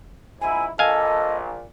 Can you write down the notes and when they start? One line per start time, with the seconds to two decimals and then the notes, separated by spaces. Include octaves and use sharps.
0.41 A#1 G#2 E4 G#5
0.79 A#1 A#2 A4 D#5 F5 G#5